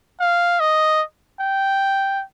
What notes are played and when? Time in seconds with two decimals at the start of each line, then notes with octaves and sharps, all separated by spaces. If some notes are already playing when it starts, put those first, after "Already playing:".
0.21 F5
0.60 D#5
1.40 G5